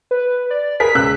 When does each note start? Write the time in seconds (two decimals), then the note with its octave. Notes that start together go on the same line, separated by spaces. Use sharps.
0.11 B4
0.51 D5
0.80 G#4 A#4 B4 B6
0.95 C#2 E6 F#6